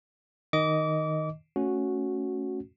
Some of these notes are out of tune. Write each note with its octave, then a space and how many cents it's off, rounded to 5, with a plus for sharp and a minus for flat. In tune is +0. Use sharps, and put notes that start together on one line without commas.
D#3 +0 D#5 +0 D6 -30
A3 +0 C#4 +5 F#4 -5